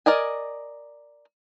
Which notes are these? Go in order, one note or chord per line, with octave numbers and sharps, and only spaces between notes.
A#4 D5 D#5 G#5